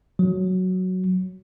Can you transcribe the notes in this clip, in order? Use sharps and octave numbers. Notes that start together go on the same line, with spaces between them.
F#3